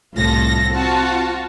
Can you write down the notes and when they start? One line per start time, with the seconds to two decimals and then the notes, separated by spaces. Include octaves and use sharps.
0.14 C2 A2 F4 A4 A#6
0.72 C4 F4 F#4 A5